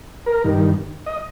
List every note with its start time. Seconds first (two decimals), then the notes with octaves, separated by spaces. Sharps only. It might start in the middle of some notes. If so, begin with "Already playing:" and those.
0.26 A#4
0.44 G2 D#3
1.06 D#5